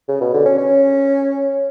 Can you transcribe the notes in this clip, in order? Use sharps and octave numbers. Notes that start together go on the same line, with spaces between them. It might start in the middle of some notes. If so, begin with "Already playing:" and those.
C#3
B2
D3
C#4
C#4